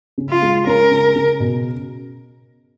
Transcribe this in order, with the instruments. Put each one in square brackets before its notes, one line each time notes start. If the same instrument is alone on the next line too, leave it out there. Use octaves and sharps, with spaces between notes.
[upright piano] C#3
[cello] F4
[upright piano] G#3
[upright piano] C#4 [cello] A#4
[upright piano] C#3
C#3
B2